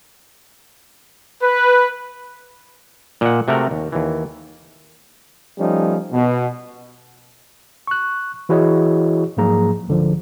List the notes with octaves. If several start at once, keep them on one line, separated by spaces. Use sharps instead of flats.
B4
A#2 D#5 F#5
C3 A3 F#4 A#4
D#2
D#2 E3
F3 G3 A3 C#4 D#4
B2
C#6 F#6
E3 E4 F#4 G#4 C#5 D#5
G#2 F3 F#3 A#3 G#4 A#5
C#2 D3 F3